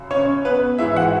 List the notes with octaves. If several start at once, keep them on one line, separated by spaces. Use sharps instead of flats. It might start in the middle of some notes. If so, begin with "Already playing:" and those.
Already playing: F#2 C#3
C#4 C#5
B3 B4
G#2 E3 E4 E5
F#4 F#5